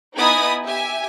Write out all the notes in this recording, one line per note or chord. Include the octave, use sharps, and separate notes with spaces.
B3 D#4 E4 G#5 B5 D#6
G4 E5 G#5